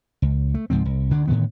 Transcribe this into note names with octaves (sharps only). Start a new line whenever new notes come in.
C#2
A3
C#2 G#2 F3 C4
C2
D2 D3 D4
A2 D3 D#3 B3